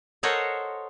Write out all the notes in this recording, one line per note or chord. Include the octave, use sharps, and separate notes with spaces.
A4 A#4 C5 C#5 D#5 F#5